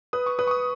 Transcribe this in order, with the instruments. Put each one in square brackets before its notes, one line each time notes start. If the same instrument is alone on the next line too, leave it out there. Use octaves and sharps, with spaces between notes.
[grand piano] B4 [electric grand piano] D#6
[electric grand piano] C#6
[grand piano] B4 [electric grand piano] D#6
[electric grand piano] C#6
D#6